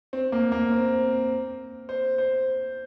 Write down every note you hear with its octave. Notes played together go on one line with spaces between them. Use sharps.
C4
A#3
A#3
C4
C5
C5